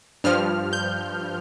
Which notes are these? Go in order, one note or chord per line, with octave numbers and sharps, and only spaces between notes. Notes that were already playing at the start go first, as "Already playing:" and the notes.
G2 F3 F6
G6